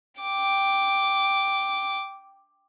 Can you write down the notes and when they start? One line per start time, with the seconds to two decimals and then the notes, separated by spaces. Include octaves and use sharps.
0.22 G5 D6